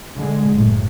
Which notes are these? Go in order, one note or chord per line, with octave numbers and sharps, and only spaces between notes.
D3 G#3
F#1 A2